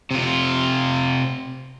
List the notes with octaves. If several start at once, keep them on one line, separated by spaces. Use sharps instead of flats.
C3 F4